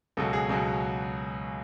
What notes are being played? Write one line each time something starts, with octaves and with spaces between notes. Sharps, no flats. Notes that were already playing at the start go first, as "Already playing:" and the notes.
C#2 B2 F#3 A4
G#4
C#2 B2 F#3